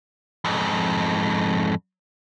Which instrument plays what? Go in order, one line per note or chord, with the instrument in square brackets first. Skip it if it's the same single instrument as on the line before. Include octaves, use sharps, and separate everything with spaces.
[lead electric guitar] F2 G#2